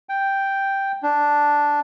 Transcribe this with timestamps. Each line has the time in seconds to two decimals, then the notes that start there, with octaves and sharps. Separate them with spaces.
0.09 G5
1.03 D4